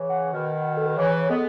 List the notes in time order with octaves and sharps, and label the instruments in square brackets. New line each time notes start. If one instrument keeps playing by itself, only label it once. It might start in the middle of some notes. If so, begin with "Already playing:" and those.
Already playing: [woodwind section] C#3 E3
[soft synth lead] F#5
[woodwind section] B2 D#3
[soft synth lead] A4
B4
[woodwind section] C#3 E3 [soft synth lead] C#5
[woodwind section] G#3 B3 [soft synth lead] A4